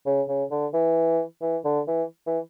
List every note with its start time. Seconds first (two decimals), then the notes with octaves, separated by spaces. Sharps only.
0.06 C#3
0.28 C#3
0.51 D3
0.74 E3
1.42 E3
1.65 D3
1.87 E3
2.27 E3